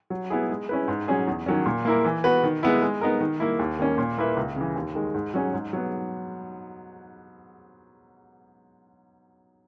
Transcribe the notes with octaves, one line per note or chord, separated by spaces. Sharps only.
F#3
B3 E4 G#4
G#3
C#4 E4 B4
G#2
F#3 C#4 G#4
E2
D#3 F#3 C#4
A#2
A#3 E4 A#4
E3
B3 F#4 B4
D#3
G#3 B3 E4
G#3
B3 D#4 A#4
D#3
A#3 E4
D#2
D#3 A#3 C#4
A#2
A#3 E4 B4 E5
C#2
C#3 E3
D#2
D#3 G#3
G#2
F#3 C#4 G#4
G#2
F#3 B3